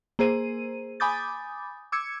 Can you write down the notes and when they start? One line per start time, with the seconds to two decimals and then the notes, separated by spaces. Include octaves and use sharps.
0.19 A#3 G#4 C5 D#7
1.00 G#5 B5 D6 D#6 G6 A6
1.92 D6 E6 G#6 C#7